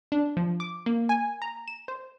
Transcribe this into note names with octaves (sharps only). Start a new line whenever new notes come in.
D4
F3
D6
A#3
G#5
A#5
E7
C5